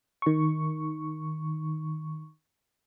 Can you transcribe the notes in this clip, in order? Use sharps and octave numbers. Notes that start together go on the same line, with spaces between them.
D#3 C#6